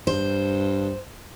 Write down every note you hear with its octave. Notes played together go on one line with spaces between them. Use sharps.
G2 C5